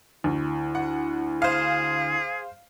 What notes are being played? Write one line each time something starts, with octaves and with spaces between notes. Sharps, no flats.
D2 E4
F#5
G#4 C5 F5